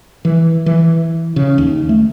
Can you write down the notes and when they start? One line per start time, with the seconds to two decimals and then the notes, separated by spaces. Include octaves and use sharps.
0.25 E3
0.66 E3
1.36 C#3
1.58 D#2
1.89 A3